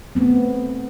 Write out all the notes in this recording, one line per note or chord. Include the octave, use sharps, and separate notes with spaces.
A3 B3 C4